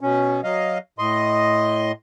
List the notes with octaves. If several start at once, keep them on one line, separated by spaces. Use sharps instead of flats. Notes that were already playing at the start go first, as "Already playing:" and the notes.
B2 C#4
F#3 D#5 F5
A2 D#5 C6